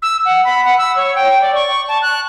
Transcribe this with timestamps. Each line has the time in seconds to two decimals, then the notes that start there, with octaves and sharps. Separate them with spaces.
0.02 E6
0.25 F#5
0.44 B5
0.64 F#5
0.78 E6
0.96 C#5
1.16 G5
1.41 D5
1.55 C#6
1.88 A5
2.02 F#6